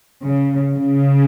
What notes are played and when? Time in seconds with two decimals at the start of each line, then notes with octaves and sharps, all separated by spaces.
0.24 C#3
0.74 C#3